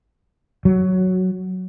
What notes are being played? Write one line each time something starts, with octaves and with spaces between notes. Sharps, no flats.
F#3